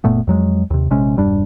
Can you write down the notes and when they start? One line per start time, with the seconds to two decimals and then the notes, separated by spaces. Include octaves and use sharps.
0.04 F#1 A#2 A3 B3
0.27 F2 F#3 G#3
0.70 D#2 C3
0.90 A#1 C3 G#3 C#4
1.16 E1 G2 G3 D4